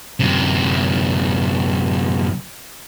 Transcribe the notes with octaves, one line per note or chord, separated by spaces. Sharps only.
F#2 C3